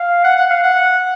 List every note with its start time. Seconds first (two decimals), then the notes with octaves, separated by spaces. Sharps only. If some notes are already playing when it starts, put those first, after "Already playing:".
Already playing: F5
0.24 F#5
0.37 F#5
0.50 F5
0.63 F#5